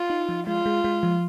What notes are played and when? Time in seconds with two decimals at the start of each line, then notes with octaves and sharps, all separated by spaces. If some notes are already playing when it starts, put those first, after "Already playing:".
Already playing: F4
0.10 D#4
0.29 F3
0.47 G#3 F4
0.66 G#3
0.84 G#3
1.03 F3